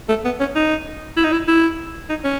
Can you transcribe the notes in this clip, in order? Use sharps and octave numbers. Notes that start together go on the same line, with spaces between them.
A3
B3
C#4
D#4
E4
D#4
E4
E4
D#4
C#4